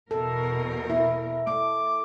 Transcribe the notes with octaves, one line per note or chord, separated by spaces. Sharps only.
E2 B2 A4 A#4
E4
A3 D6